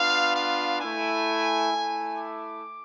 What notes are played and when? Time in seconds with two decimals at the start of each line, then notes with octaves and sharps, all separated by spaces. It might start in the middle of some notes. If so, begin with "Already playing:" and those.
Already playing: B3 D4 F4 F5
0.36 F5
0.81 A3 E4 G#5
1.72 A3 E4
2.18 D6